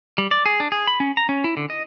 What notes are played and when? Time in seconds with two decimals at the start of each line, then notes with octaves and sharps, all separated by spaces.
0.18 G3
0.31 D5
0.46 G#4
0.60 D4
0.72 G#4
0.87 B5
1.00 C#4
1.17 A#5
1.29 C#4
1.44 E4
1.57 D3
1.70 D#5